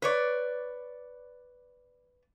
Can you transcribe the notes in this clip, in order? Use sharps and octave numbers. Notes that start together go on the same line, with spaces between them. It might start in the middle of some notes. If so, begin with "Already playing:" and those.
B4 C#5 D5